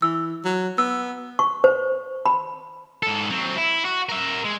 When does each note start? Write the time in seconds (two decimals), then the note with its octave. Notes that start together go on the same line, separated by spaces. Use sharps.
0.02 E3 E6
0.45 F#3
0.78 B3 E6
1.39 C#6
1.64 C5
2.26 B5
3.03 G#2 A4
3.30 F#3 C4
3.57 E4
3.85 F#4
4.09 A#4 E5
4.44 G#3